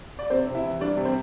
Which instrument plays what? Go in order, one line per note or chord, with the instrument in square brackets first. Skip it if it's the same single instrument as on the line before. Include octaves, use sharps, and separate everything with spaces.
[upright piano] D5
C3 C4 C5
C3
E4 E5
E3
G3 D4 D5
C3
C4 C5